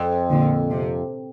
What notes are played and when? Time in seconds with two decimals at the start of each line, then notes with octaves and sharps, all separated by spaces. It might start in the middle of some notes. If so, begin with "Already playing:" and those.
Already playing: F2
0.30 A#2 D3
0.70 C3